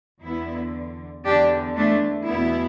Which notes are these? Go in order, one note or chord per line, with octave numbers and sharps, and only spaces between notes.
E2 D3 B3 E4
E2 D3 D4 G4
A3 D4
E2 B2 B3 E4